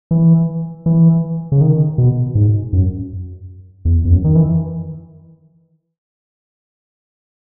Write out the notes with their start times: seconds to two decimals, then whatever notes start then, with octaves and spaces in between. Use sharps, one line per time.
0.11 E3
0.86 E3
1.52 C#3
1.61 D#3
1.98 B2
2.35 G#2
2.73 F#2
3.85 E2
4.05 E2
4.11 F#2
4.24 D#3
4.35 E3